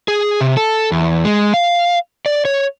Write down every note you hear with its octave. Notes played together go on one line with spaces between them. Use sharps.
G#4
C3
A4
E2
G#3
F5
D5
C#5